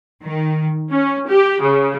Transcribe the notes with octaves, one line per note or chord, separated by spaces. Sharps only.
D#3
C#4
G4
C#3